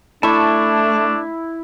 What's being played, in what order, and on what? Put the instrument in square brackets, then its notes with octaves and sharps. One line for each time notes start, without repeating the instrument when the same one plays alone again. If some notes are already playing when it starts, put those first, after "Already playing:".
[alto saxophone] A3 [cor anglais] D4 [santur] E4 [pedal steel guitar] A5 C#6